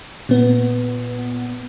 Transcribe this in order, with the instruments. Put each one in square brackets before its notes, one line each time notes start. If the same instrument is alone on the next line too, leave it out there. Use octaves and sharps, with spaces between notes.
[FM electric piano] A#2 B3